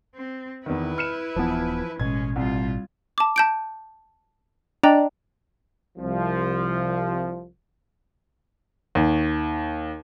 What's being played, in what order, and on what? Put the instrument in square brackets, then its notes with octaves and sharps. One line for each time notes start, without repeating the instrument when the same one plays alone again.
[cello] C4
[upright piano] E2 D#3 [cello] E4 B4
[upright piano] F6 C#7 E7
[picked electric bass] D#1 B3 [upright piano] E3 F3
[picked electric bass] A1 B2 [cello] G#3 C#4 [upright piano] G#6
[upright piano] C2 [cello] G3 F4
[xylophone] A5 D6
A5 G6 D7
[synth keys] D4 [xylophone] D#5 G5 A#5
[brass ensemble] C2 F3
[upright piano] D#2